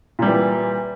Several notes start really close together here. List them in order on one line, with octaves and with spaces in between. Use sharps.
A#2 G3 E3